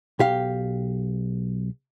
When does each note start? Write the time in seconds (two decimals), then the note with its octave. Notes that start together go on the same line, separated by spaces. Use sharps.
0.19 B1 G4 F5